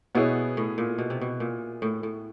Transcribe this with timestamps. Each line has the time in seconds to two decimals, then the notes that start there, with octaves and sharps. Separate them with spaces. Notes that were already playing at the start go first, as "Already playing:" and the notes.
0.15 B2 B3 E4 G#4 C#5
0.57 A2
0.78 A#2
0.99 B2
1.10 C3
1.21 B2
1.40 A#2
1.82 A2
2.03 A2